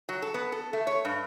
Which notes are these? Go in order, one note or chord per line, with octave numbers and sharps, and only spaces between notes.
F#3
A4
B3
A4
A3
C#5
G2